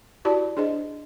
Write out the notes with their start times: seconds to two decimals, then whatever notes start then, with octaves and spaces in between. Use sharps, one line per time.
0.25 E4 F#4 G4 D5 A5 B5
0.57 D4 G#4 C5 D#5